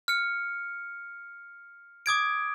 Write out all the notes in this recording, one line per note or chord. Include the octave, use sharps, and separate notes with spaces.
F6 C#7
D6 D#6 G#6 D7